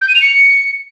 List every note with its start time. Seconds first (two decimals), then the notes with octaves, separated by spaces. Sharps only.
0.01 G6
0.08 D#7
0.15 F7
0.22 C#7